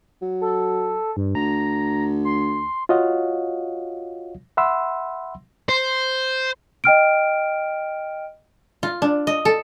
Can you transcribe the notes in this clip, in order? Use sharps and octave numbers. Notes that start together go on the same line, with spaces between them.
F#3
A4
G2
D2 A#5
C6
F4 F#4 C#5 D#5 F5 F#5
E5 F#5 B5 C6 E6
C5
D#5 G5 F6 D7
F4
D4
D#5
A4